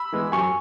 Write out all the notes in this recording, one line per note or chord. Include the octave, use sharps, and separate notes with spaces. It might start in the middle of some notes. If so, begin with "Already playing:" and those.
Already playing: B5 E6
E3 G#3 B3
F#2 G#5 C#6